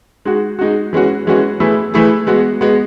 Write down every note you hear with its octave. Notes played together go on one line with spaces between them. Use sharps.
G#3 D#4 F#4
G#3 D#4 F#4
E3 G#3 C#4 F#4
E3 G#3 C#4 F#4
E3 A3 E4 G#4
E3 A3 E4 G#4
G#3 B3 F#4
G#3 B3 F#4